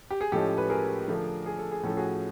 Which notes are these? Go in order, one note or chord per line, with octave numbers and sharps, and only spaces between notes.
G4
G#4
A2 F3 G#3 C#4 G4 A4
B4
G#4 A#4
D3 F3 A3 D4
G#4
A4
G#4
A2 F3 A3 C#4 A4
F#4 G#4